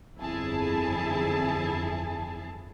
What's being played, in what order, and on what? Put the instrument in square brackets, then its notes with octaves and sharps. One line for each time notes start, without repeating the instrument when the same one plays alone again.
[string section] G1 F2 E4 G#4 A5